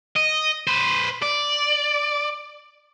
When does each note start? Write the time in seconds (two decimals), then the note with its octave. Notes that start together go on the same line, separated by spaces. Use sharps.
0.16 D#5
0.67 B4 C5
1.22 D5